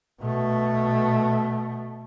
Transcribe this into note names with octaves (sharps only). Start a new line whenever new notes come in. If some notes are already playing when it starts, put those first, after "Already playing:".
B2 A3